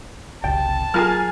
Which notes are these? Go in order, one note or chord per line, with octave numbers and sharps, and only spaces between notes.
F#1 C2 C3 G5 A5
F#3 F4 G#4 A#4 G#5 F6